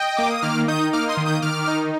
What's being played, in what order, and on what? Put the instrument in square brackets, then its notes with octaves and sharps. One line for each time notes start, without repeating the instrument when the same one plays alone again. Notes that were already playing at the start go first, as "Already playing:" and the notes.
Already playing: [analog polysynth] D#5 G5
A#3 D6
D#6
D#3 D6 F6
D#4 D#6 G6
A#3 D6 F6
C6 D#6
D#3
D#6 G6
D#3 D6 F6
D#4